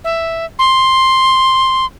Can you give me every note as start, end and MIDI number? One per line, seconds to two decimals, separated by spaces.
0.04 0.46 76
0.59 1.86 84